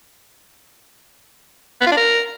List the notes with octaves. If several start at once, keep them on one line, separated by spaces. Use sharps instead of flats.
B3
F4
D4
A#4